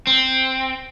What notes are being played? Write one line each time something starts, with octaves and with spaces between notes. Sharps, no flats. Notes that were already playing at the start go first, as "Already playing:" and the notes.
C4